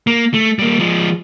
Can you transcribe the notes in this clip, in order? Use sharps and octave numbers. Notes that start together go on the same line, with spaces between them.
A#3
A3
G3 A#3
F3 G#3